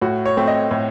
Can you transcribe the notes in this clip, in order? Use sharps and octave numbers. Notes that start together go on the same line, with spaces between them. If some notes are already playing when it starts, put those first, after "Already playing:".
A2 F#4
C#5
A3 C4
D#5
A2